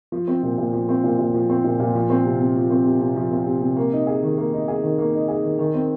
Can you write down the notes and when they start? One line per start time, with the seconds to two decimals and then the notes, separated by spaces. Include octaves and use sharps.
0.12 F3
0.28 C4
0.43 A#2
0.58 A#2
0.73 F3
0.89 C4
1.04 A#2
1.19 A#2
1.34 F3
1.49 C4
1.64 A#2
1.79 A#2
1.95 F3
2.10 C4
2.25 C3
2.40 C3
2.56 F3
2.70 C4
2.86 C3
3.01 C3
3.16 F3
3.32 C4
3.46 C3
3.61 C3
3.76 A#3
3.92 D#4
4.07 G#4
4.23 D#3
4.38 A#3
4.53 D#4
4.68 G#4
4.83 D#3
4.98 A#3
5.14 D#4
5.28 G#4
5.43 D#3
5.59 D#3
5.74 C4